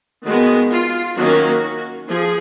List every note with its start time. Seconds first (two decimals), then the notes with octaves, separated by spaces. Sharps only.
0.25 D#3 G#3 B3 F#4
0.71 F4
1.16 D#3 F#3 A#3 C#4 F#4
2.08 F3 G#4